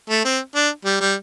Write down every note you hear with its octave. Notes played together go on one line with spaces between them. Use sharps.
A3
C4
D4
G3
G3